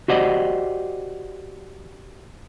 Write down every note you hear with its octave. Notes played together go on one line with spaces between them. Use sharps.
F#4 G4 C5 D5 D#5 F#5